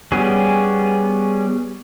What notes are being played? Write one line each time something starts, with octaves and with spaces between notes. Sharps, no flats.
G3 B3 C#4 G#4